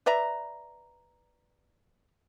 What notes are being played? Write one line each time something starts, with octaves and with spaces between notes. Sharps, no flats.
B4 D5 E5 A#5